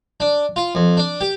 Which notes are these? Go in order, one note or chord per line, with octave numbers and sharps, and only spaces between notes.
D4
F4
F2
D4
G4